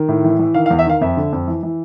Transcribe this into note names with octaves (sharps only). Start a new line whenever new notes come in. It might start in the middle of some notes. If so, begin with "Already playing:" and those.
Already playing: D#3
A2
E3
E3
D#3 F5
F5
E2
E5
D#3 F5
F2 E5
D3
F2
E3
E3